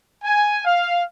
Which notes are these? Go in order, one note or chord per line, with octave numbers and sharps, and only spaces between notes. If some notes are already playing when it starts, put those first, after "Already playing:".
G#5
F5